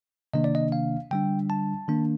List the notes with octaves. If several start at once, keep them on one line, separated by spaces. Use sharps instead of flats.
C3 D#3 A#3 D4 D#5
D5
D#5
F5
D3 G3 D4 G5
A5
D#3 A#3 D4